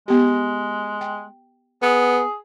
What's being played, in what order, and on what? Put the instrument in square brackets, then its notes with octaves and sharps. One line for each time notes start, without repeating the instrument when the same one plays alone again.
[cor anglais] G#3 [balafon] B3 G4
[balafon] G5
[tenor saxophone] B3 [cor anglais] G#4